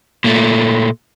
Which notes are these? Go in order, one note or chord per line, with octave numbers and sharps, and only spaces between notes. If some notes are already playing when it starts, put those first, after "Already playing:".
A#2 A3